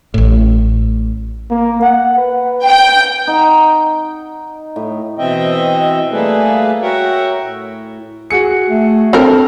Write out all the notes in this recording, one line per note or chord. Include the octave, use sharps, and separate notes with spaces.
A1 A2
A#3
F#5
B4
G5
D#4 F#5
A2
B2 E3 C4 D#5 E5 G5
G3 A3 A#3 G#4 A4 B4
F#4 A#4 C#5 E5 F#5 G5
A2
F#4 G#4 C#7
A3
C4 D4 A4 A#4